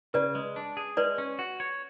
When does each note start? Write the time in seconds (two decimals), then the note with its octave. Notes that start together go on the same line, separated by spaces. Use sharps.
0.14 C#3 B4 D5
0.35 G#3
0.56 D4
0.77 G#4
0.97 G#3 B4 D5
1.18 C#4
1.39 F#4
1.60 C#5